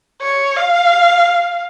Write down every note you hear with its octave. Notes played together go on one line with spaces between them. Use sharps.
C#5
F5